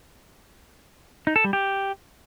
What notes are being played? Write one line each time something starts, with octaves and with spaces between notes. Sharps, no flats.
D#4
A4
G3
G4